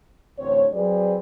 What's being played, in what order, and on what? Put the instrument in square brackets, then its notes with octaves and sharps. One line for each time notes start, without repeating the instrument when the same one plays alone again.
[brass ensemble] A1 D2 C4 C#5
F#3 C4 G#4 B4 D5